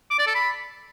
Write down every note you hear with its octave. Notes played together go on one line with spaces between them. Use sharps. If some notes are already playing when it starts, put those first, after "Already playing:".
D6
D5
A4
B5